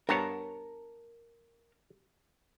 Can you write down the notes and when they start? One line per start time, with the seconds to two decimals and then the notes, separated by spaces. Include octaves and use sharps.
0.09 G2 B3 A#4 C#5 A5